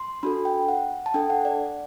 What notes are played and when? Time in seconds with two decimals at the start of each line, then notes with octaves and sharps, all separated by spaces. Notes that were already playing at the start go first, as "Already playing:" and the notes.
Already playing: C6
0.23 D4 F#4 A4 B5
0.45 G5
0.68 F#5
1.06 A5
1.14 D4 A4 G5
1.30 F#5
1.45 D5